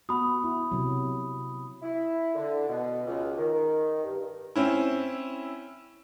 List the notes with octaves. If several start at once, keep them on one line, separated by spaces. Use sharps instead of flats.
B3 F#4 B5 D#6
E4
C3 F#3
E4
D3
B2
C#2
D#3
G2
C4 C#4 E4